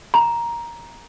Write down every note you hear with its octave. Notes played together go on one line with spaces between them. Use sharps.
A#5